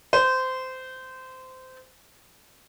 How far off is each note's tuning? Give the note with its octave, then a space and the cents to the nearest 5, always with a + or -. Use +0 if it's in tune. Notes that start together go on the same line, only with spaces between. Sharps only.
C5 -20